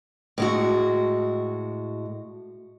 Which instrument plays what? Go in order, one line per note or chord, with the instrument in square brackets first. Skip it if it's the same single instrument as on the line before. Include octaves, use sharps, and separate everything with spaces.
[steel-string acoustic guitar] A2 G#3 F#4